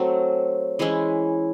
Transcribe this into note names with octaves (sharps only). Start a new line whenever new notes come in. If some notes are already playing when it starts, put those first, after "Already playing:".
Already playing: F#3 A3 C4
E3 G#3 C#4 E4